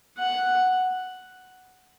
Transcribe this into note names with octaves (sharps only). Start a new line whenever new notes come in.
F#5